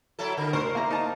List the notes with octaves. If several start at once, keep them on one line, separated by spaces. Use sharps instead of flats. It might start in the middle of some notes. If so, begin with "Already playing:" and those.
F#3 E4 A4
D3
D2 A#4 C5 C#6
A#3 E4 A#5
D#4 A5 A#5